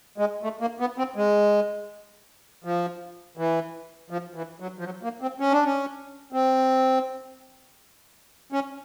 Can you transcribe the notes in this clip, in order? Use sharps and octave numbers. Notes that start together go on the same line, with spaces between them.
G#3
A3
A#3
B3
C4
G#3
F3
E3
F3
E3
F#3
F3
F#3
A#3
C4
C#4
D4
C#4
C4
C#4